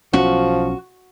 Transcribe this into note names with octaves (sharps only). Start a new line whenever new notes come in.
B1 F3 C#4 F#4